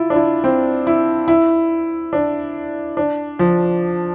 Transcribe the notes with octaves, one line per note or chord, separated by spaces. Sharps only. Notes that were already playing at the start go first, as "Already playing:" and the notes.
Already playing: E4 F4
D4
E4
C4
E4
E4
D4
D4
F3